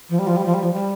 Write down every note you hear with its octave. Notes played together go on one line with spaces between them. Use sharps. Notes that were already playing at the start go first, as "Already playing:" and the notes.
F3
G3
F3
G3
F3
G3
F3
G3